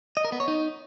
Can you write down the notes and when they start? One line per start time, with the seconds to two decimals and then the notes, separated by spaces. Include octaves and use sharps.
0.17 D#5
0.25 A#4
0.32 B3
0.40 C#5
0.48 D#4